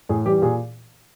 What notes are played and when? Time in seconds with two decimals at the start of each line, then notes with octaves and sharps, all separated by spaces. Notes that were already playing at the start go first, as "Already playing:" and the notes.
0.09 A2 G#4
0.26 E3 G3 G4
0.38 G4
0.42 A#2 G#4